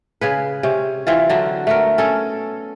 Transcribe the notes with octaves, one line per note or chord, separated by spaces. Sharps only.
C#3 G#4 B4
C3 C#4
E3 C4 F4
D3 F#3 D4 F#4
A3 B3 A#4
C#4 A4